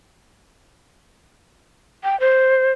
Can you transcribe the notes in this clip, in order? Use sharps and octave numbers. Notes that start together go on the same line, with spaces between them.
G5
C5